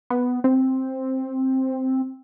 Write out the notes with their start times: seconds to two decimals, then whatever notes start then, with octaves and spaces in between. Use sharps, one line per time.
0.10 B3
0.44 C4